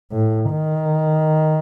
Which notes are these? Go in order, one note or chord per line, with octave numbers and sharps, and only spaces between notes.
A2
D#3